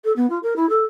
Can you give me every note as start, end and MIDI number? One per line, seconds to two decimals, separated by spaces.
0.04 0.14 69
0.16 0.28 59
0.30 0.39 65
0.43 0.54 70
0.56 0.68 64
0.69 0.84 69